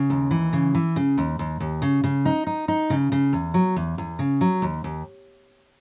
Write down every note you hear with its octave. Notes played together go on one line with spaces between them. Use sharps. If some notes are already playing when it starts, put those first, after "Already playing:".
Already playing: C#3
D#2
E3
C#3
E3
C#3
D#2
D#2
D#2
C#3
C#3
D#4
D#4
D#4
C#3
C#3
E2
F#3
E2
E2
C#3
F#3
D#2
D#2